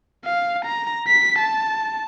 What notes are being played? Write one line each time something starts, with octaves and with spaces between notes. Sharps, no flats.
F5
A#5
B6
A5